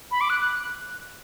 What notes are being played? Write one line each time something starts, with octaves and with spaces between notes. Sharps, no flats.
B5
D6
F#6
F#6